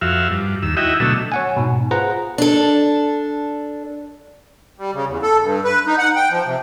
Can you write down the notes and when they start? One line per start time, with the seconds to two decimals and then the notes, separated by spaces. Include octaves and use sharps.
0.01 F2 F#4 E5 F5
0.31 G2
0.62 D#2 E6
0.77 E4 F#4 D#5 E5 G5
1.00 B2 D3 F#3 A3 E6
1.32 C#5 F#5 G#5
1.57 G#2 B2
1.91 F4 G#4 B4 C5 F#5 A#5
2.38 D4 A4
4.78 G3
4.94 C#3
5.07 E2
5.23 A4
5.42 G2
5.64 B4
5.87 D#4
5.98 F#5
6.16 G5
6.30 F3
6.45 C3